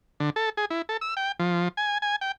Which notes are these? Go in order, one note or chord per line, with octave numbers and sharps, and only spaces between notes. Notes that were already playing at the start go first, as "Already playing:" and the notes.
D3
A4
G#4
E4
A4
E6
G5
F3
G#5
G#5
G5